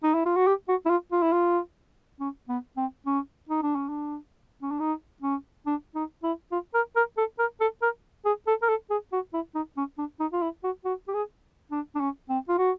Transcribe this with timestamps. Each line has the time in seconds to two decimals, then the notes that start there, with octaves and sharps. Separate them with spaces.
0.03 D#4
0.14 E4
0.26 F4
0.36 F#4
0.47 G4
0.69 F#4
0.86 E4
0.90 F4
1.12 F4
1.22 E4
1.33 F4
2.20 C#4
2.49 B3
2.77 C4
3.06 C#4
3.49 D#4
3.63 D4
3.76 C#4
3.89 D4
4.62 C#4
4.71 D4
4.80 D#4
5.23 C#4
5.66 D4
5.95 D#4
6.23 E4
6.52 F4
6.74 A#4
6.96 A#4
7.18 A4
7.39 A#4
7.60 A4
7.82 A#4
8.26 G#4
8.47 A4
8.62 A#4
8.68 A4
8.90 G#4
9.13 F#4
9.34 E4
9.55 D#4
9.77 C#4
9.98 D4
10.20 D#4
10.33 F4
10.42 E4
10.64 F#4
10.85 F#4
11.08 G4
11.14 G#4
11.72 D4
11.95 D4
12.01 C#4
12.29 C4
12.49 F4
12.58 F#4